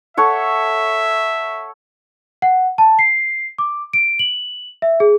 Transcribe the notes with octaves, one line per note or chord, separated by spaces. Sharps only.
A4 C#5 E5 F#5
F#5
A5
C7
D6
D7
F#7
E5
G#4